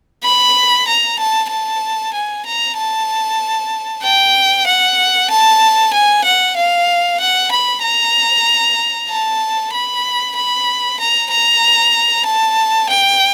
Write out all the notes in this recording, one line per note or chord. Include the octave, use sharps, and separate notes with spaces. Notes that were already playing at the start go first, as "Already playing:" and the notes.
B5
A#5
A5
A5
G#5
A#5
A5
G5
F#5
A5
G#5
F#5
F5
F#5
B5
A#5
A5
B5
B5
A#5
A#5
A5
G5